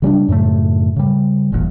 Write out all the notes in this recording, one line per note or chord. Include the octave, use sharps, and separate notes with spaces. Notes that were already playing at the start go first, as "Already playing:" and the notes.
C#3 G3 C#4 D4
F#2 A2 C#3 A3
C#3 G3
E1 A1 E2 A#2